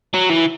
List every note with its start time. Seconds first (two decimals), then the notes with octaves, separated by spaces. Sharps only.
0.14 F#3
0.30 E3